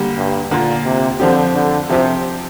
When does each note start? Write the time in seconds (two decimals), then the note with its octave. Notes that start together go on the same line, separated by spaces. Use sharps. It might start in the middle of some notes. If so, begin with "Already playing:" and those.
Already playing: D3 G3 A#3 G4
0.16 G2
0.51 A#2 D3 A#3 F4
0.85 C3
1.19 F2 D3 F3 C4 G4
1.55 D3
1.89 C3 F3 C4 G4